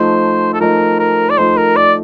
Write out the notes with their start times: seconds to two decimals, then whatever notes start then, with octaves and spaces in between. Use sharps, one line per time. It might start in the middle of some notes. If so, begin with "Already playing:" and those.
Already playing: F3 A3 D#4 C5
0.54 A4
0.61 F3 A3 D#4 A#4
0.99 A#4
1.30 D5
1.37 F3 A3 D#4 C5
1.57 A#4
1.76 D5